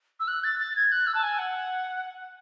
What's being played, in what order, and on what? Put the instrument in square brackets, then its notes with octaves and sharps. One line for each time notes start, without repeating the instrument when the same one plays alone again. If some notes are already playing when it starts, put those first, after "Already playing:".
[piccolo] E6
F#6
A6
A6
G#6
F#6
E6
A5
G#5
F#5